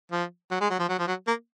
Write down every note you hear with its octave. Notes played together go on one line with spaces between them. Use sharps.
F3
F#3
G#3
F#3
F3
F#3
F3
F#3
A#3